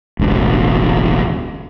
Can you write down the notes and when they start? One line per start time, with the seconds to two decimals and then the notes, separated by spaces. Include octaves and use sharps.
0.19 E1 A1 D2